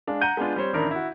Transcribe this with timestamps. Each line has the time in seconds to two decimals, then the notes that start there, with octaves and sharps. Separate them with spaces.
0.07 G#3 D4 F5
0.21 F#5 A#5 G6 D#7
0.37 G#3 B3 D4 F4
0.56 G3 C4 C5 C#5
0.73 A1 D#3 D4 A#4 B5
0.91 E4 F#4